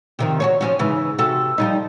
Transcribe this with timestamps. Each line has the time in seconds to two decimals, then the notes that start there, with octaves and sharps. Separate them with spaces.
0.19 C3 D#3 F3
0.40 F#4 G#4 C#5
0.61 F3 C#4 F#4
0.79 G#2 C#3 E3
1.18 C3 F#4 A4
1.58 F3 G3 D#4